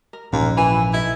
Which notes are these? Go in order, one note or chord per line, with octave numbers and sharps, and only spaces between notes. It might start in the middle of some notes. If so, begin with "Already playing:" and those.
A#4
A#1 D#2 G#2 C#4
E3 E4 G#5 B5
D#4 E4 A4 E5